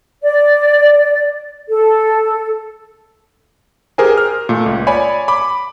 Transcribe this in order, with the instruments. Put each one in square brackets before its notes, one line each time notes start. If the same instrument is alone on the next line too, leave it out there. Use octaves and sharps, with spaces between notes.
[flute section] D5
A4
[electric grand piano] G4 G#4 A#4 C5 G#5
F6
A#2 A3
C#2
C#5 D5 G#5 B5
B5 D6